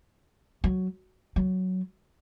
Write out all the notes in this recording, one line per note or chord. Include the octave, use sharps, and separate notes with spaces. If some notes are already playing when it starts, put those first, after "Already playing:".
F#3
F#3